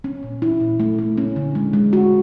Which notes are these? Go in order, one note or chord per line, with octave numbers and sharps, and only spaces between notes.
C#4
A#2
E4
A#2
A3
A3
C#4
D3
G#3
G#3
F#4